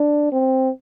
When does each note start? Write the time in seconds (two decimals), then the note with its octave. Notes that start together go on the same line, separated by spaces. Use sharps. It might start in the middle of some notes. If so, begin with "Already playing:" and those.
Already playing: D4
0.32 C4